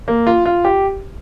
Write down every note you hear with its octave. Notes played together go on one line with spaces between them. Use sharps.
A#3
F4
F4
G4